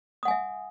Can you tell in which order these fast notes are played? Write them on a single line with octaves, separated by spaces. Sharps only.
D#6 F#5 G#5 E5